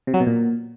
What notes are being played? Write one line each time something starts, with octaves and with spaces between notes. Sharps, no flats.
C3
F#3
B2
A#2